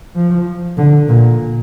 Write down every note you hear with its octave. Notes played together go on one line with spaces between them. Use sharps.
F3
D3
A#2